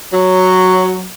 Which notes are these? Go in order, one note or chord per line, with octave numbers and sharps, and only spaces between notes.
F#3